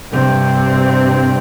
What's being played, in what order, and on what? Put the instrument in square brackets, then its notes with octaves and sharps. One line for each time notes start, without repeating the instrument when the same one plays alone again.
[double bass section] G2 C3 C4